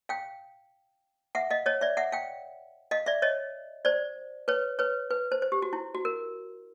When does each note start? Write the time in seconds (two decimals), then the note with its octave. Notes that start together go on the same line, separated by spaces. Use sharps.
0.09 F5 G5
1.35 E5 F#5
1.50 D#5 F5
1.66 C#5 D#5
1.81 D5 E5
1.97 E5 F#5
2.12 F5 G5
2.91 D#5 F5
3.06 D5 E5
3.22 C#5 D#5
3.85 C5 D5
4.48 B4 C#5
4.79 B4 C#5
5.10 B4
5.32 C5
5.42 C5
5.52 G4
5.62 F#4
5.73 E4
5.95 F#4
6.05 A#4